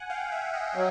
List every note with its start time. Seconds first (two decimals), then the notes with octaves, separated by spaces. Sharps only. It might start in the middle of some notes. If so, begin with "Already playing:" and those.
Already playing: F#5 G#5
0.10 F5 G5
0.32 E5 F#5
0.53 D#5 F5
0.75 F#3 E5